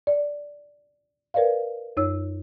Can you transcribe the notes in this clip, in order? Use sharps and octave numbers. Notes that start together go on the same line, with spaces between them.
D5
A#4 B4 D5 D#5 F5
F#2 D#4 C#5 E6